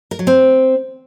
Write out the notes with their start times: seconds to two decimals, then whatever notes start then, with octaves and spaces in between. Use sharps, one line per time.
0.11 A#4
0.19 F#3
0.27 C4